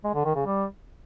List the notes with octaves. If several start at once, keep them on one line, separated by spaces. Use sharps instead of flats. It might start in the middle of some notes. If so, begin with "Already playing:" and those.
G#3
D3
D#3
C#3
G3